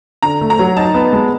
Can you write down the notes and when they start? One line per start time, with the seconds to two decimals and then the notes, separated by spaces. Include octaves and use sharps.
0.22 D3 A#5
0.41 A3
0.50 A#5
0.59 F#3
0.76 D#4 A5
0.94 B3
1.13 G#3